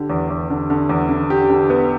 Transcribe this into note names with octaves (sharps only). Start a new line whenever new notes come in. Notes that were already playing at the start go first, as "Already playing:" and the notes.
Already playing: D3 G4
E2
E2
D3
D3
E2
D3
G4
D3
B3